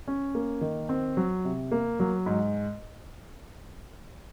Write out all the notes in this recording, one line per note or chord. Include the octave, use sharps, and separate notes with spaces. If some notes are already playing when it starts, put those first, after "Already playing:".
C#4
A#3
D#3
C4
F#3
C3
A#3
F#3
G#2